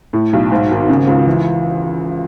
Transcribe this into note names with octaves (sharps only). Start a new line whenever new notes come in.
A2
B1
G#2
G#1
C#3
C#2
E3